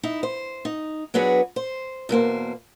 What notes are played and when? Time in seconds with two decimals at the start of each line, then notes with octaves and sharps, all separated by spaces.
0.03 D#4 E4
0.23 C5
0.65 D#4
1.14 F#3 B3 D4 F#4 G#4 B4
1.56 C5
2.09 E2 B2 A#3 C5